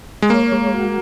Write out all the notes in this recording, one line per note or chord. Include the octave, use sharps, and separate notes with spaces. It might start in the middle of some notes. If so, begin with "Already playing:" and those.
G#3
A#3 C#5
G#3
F#4